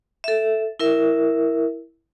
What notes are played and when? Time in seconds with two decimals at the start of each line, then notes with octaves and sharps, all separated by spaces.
0.24 A4 E5
0.79 E4 A#4 E5